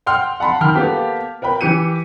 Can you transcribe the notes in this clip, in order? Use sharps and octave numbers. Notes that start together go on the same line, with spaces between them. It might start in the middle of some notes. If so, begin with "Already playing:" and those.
F#5 G5 C6 F6
F#5 A5 B5 C6
D#3 A#4 G5 B5 F6
A#3 B3 G4 A4
A#4 B4 G5 B5
E3 G4 C#7 D#7